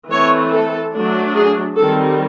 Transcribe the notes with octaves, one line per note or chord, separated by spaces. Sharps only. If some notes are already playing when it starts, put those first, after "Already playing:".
E3 A3 C4 C#5
A4
F#3 A3 D4
G#4
D#3 G3 C4 A4